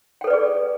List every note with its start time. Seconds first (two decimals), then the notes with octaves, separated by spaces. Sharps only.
0.21 G5
0.24 A4
0.27 B4
0.30 D5
0.33 G#4